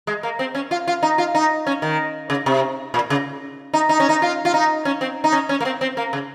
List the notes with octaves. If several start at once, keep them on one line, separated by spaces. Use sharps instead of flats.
G#3
A#3
C4
C#4
F4
F4
D#4
F4
D#4
C#4
D#3
C#3
C3
A#2
C#3
D#4
D#4
C#4
D#4
F4
F4
D#4
C#4
C4
D#4
C#4
C#4
A#3
C4
C4
A#3
C#3